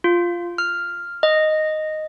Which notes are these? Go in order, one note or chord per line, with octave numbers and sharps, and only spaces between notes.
F4
F6
D#5